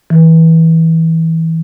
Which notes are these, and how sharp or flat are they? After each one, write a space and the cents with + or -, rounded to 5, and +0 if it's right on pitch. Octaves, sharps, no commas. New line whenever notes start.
E3 -20